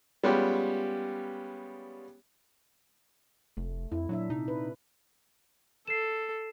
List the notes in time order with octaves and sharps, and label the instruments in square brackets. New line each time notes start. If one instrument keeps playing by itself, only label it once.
[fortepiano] G3 G#3 B3 C#4 F4 G4
[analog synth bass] F1 [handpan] A3
[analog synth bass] F2 [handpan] E4
[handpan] A#2 D4 E5 [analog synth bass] F#3
[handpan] C3 [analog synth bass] D#4
[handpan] B4
[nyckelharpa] A4 [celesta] C7 E7